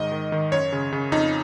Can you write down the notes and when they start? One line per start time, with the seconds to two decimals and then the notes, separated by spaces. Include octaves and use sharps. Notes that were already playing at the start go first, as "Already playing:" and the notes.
Already playing: G#2 D#3 D#5
0.12 D#3
0.32 D#3
0.52 F#2 C#5
0.72 C#3
0.92 C#3
1.12 F2 D#4